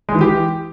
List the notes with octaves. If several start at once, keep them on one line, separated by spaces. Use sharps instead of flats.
G#3
E3
G4